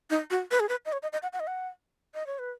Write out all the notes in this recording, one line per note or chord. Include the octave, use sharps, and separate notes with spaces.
D#4
F#4
B4
G#4
B4
D#5
C#5
D#5
D#5
F#5
F#5
D#5
F#5
D#5
C#5
B4